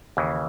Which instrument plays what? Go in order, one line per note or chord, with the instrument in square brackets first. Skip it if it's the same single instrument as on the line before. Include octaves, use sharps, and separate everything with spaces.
[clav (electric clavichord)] D#2 C#3 E3